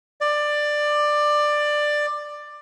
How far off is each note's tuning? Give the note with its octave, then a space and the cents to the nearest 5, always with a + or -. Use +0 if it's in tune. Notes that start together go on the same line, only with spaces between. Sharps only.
D5 +15